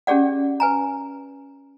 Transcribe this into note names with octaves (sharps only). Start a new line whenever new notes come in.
C#4 G4 G#4 D5 F#5
B4 G#5 A#5